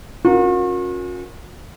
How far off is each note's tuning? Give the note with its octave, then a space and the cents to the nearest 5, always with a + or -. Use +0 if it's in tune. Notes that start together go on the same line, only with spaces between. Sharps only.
C#4 +0 F#4 -45 A#4 +0